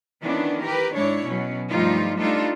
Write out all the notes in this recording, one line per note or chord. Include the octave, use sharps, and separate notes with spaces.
D#3 E3 B3 C#4 D4
G4 A#4 B4
G#2 D4 E4 C#5
B2 F#3 C#4
G2 F3 G3 A3 D#4 F4
G3 A3 D4 D#4 F4 A4